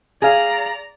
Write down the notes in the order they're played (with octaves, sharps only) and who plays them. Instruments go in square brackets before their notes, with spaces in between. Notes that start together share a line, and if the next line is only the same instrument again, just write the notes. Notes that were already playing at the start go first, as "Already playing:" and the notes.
[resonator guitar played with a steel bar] G#4 F5 [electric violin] D5 A#5